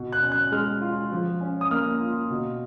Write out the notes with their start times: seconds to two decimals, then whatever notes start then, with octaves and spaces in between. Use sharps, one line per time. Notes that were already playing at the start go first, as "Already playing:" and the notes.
Already playing: B2
0.12 F#6
0.22 C#4
0.32 F#6
0.52 G#3 F6
0.81 F4
1.12 F3
1.41 C#4
1.61 D#6
1.71 A#3 F6
2.00 F4
2.30 B2